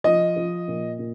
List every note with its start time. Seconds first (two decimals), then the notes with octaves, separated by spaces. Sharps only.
0.04 F3 D#5
0.36 F3
0.68 A#2
0.99 A#2